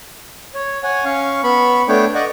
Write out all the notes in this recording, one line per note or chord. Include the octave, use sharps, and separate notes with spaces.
C#5
C#5 F#5 G#5
C#4 F5 C#6
B3 B5 C#6
A3 B3 D4 C#5 G5 D6
D5 D#5 F#5 C#6 D6